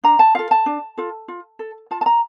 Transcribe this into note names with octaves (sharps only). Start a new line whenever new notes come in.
D4 A#5
A5
F4 A4 F5
A5
D4
F4 A4
F4
A4
F4 A5
A5
A#5